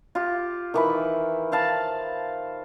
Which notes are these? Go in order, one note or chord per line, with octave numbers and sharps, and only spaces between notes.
F4 G4
D#3 E3 B5
C5 F5 A5 B5